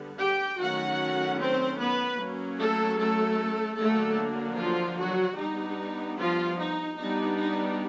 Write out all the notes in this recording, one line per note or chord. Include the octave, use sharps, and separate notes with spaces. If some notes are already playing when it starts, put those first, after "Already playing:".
Already playing: D3 G3 B3
G4 G5
D#3 F#3 A3 C#4 F#4 F#5
C4 C5
B3 B4
F#3 A#3 C#4
A3 A4
A3 A4
D3 F#3 A3 A#3 D4 A4
F3 F4
F#3 F#4
G3 B3 D4 D#4
F3 F4
D#4
G3 B3 D4 D#4
D#4